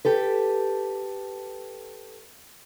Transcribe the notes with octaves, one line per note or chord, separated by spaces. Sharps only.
G4 A4 B4